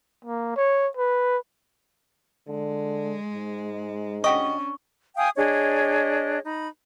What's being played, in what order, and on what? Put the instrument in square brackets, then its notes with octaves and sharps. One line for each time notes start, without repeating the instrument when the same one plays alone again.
[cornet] A#3
C#5
B4
[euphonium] D3 [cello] G#3
[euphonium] G#2
[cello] C#4 D4 [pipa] F#4 G4 D#5 [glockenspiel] C#6
[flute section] F5 G5 G#5 D#6
D4 G#4 C#5 D#5
D#4 B5